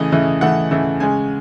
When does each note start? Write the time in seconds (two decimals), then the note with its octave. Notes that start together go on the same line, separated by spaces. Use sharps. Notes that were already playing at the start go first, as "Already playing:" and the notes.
Already playing: C#3 E3 A3 D#5
0.12 C#3 E3 A3
0.41 C#3 E3 A3 F#5
0.71 C#3 E3 A3
1.00 C#3 G#3 G#5